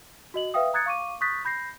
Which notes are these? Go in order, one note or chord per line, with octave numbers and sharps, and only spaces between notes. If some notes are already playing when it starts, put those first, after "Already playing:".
F#4 D#5 F#7
B4 E5 F5 G5 D#6
A#5 D#6 F#6 G#6 A6 C#7
F5 C#6 D6 D#7
C#6 D#6 F#6 G6 A6 B6
B5 G6 A#6 C7